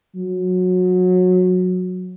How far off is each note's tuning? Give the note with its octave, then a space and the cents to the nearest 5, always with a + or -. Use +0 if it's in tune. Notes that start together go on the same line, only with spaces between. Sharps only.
F#3 -20